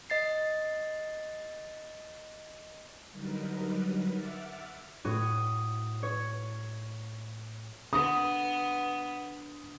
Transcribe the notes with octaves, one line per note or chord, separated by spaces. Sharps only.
D#5 A6 C7
D3 F#3 G3 D#4 A#4 B4
E5 F#5 D6 F6 A6
A2 F#4 C#5 D#6
C#5
D3 B3 D#6